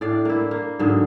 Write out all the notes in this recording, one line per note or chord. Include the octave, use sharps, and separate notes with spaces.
A2 D4 D5 F5
A#3 E4
A#3
G#2 D3 F#3 G#3